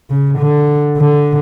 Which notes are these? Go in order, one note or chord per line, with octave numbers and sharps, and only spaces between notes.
C#3
D3
D3